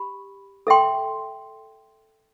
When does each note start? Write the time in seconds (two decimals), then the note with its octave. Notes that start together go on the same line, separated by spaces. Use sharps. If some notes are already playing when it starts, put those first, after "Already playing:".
Already playing: G4 B5
0.67 A4 E5 G5 C6